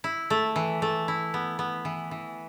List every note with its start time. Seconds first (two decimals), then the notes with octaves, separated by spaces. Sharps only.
0.04 E4
0.30 A3
0.56 E3
0.82 A3
1.08 E4
1.34 B3
1.59 B3
1.85 E3
2.11 E3